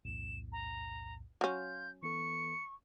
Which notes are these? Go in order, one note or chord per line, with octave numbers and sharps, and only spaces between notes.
B1 E2 A2 E7
A#5
F#3 C#4 F5 C6 F6 G6
E3 B3 A4 C#6 C#7